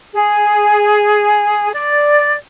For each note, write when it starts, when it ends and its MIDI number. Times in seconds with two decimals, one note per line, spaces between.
0.14 1.70 68
1.74 2.35 74